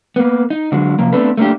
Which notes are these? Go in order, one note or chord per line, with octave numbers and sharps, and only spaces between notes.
A#3 B3
D#4
D3 F#3 G#3
C3 F3 A#3
A3 B3 C4 D4 A4 B4
A3 A#3 D4 G4